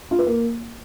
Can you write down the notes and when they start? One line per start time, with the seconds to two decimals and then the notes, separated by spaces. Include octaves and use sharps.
0.11 F4
0.19 B4
0.26 A#3